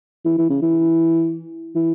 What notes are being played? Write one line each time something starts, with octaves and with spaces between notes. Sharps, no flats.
E3
E3
C#3
E3
E3